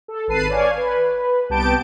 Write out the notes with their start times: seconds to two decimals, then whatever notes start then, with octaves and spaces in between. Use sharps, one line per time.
0.08 A4
0.28 G#1 B4 A5 C7 D#7
0.49 C#5 D5 F5 G#5
0.77 B4
1.49 C2 B3 G4 A5 G6 D7